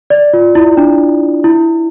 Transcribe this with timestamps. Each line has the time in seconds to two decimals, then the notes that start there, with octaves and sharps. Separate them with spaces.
0.10 D5
0.33 F4
0.55 E4
0.77 D4
1.44 E4